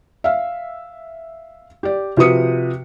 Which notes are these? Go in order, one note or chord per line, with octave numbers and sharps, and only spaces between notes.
E5 F5
G4 D5
C3 F3 F#4 B4 D#6 C#7